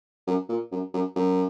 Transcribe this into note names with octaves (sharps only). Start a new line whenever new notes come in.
F#2
A#2
F#2
F#2
F#2